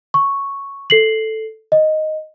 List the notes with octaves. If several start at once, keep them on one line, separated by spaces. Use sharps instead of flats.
C#6
A4 C7 F#7
D#5